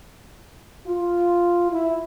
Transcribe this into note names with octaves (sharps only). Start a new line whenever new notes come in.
F4
E4